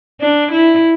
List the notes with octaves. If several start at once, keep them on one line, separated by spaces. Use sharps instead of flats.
D4
E4